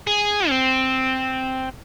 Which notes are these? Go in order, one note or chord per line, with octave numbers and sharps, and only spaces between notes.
G#4
C4